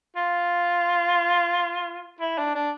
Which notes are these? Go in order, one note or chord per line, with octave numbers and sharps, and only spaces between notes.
F4
E4
D4
D4